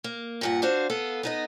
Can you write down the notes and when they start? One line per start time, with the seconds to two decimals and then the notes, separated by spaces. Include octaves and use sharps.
0.04 A#3
0.41 G2 A#2 F#5
0.62 D4 F#4 C5 F5
0.90 B3 A4 F5
1.23 B3 D#4 D#5